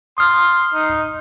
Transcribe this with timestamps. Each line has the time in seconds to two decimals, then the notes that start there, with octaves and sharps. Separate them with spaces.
0.18 C6 D#6 F6
0.74 D#4